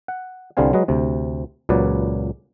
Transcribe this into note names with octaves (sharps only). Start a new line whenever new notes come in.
F#5
C2 D3 G3 C4 F5 G#5
F#3 G#3 B4 D#5
D2 C3
C#2 A#2 F#3 B4 D5